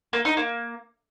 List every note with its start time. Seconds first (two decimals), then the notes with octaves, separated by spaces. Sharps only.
0.13 A#3
0.25 D#4
0.37 A#3